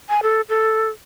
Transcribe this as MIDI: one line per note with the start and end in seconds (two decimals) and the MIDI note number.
0.09 0.20 80
0.23 0.41 69
0.49 0.89 69